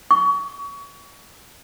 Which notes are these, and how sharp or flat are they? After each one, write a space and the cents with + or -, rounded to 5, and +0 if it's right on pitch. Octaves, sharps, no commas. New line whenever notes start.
C#6 +30